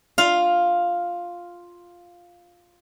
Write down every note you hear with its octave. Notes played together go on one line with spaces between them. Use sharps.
F4 F5